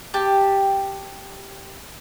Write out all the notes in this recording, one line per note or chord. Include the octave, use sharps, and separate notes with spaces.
G4 A5